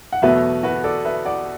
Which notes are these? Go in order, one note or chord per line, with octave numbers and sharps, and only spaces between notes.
F#5
E2 B2 F#3 A3 B4 E5
F#4 B4
A4 D5
B4 E5
D5 F#5